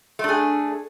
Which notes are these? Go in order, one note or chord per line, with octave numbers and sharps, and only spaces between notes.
A3 D4 G#4